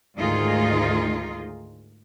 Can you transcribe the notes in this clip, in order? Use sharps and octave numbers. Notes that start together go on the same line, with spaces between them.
D2 G#2 D#3 D#4 F4 G#4